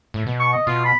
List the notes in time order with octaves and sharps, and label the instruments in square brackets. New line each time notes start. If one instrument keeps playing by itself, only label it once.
[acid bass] A2
B2
[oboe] C#6
D#5
[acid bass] B2 [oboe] F4
[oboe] B5